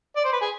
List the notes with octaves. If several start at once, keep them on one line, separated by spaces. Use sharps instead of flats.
D5
C5
B4
G#4